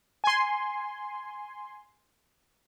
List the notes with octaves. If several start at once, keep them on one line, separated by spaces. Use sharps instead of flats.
G#5 C6